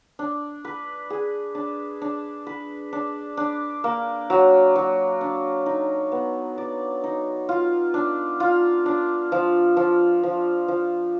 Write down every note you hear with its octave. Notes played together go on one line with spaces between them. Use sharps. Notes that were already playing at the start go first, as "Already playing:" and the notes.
D4
B4
G#4
D4
D4
B4
D4
D4
A#3
F#3
F#3
D4
D#4
B3
D5
D#4
F4
D4
F4
D4
F3
F3
F3
F3